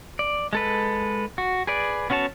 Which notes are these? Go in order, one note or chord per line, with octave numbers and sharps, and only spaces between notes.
D5
G#3 A4 B4
F#4
G#4 B4 D5
B3 C#4 F#4 C#5 A5